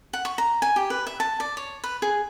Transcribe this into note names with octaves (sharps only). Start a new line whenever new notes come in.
F#5
C#6
A#5
G#5
G4
B4
E5
A5
D5
C#5
B4
G#4